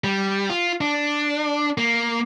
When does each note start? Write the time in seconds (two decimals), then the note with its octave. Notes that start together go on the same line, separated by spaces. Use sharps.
0.04 G3
0.50 F4
0.81 D4
1.78 A#3